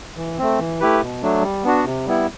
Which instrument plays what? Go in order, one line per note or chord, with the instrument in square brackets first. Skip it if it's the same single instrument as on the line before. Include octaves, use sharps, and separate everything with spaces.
[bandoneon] E3
A3 C4
E3
A3 E4 G4 B4
B2
F#3 A3 D4
G3
B3 D4 F#4
C3
G3 B3 E4